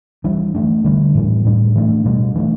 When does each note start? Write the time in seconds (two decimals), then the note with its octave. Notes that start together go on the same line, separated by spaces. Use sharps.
0.24 E3 G3 D4
0.55 E3 A3 D4
0.84 D3 G3 D4
1.15 A2 E3 G3
1.45 A2 G3 D4
1.76 E3 A3 D4
2.05 B2 G3 D4
2.35 E3 A3 D4